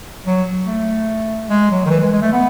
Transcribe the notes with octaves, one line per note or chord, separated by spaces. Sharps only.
F#3
A3
G#3
F#3
D#3
E3
G#3
G#3
A3
B3